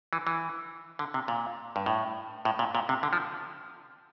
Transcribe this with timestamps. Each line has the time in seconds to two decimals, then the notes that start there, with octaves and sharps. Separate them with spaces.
0.13 E3
0.27 E3
0.99 D3
1.14 C3
1.28 A#2
1.76 G2
1.86 A2
2.45 A2
2.59 A#2
2.75 A#2
2.89 C3
3.03 D3
3.13 F3